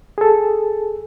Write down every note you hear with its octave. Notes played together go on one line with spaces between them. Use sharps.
G#4 A4